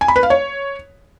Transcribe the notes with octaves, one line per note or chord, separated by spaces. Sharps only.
G#5
B5
B4
F5
C#5